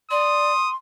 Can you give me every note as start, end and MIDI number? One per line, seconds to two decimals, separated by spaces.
0.11 0.52 74
0.11 0.75 84
0.11 0.70 87